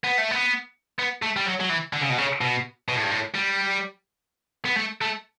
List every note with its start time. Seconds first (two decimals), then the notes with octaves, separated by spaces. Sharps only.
0.04 B3
0.18 A3
0.31 B3
0.99 B3
1.22 A3
1.36 G3
1.45 F#3
1.60 F#3
1.69 E3
1.93 D3
2.02 C#3
2.10 B2
2.18 C#3
2.41 B2
2.88 B2
2.95 A2
3.03 G2
3.11 A2
3.35 G3
4.65 B3
4.77 A3
5.01 A3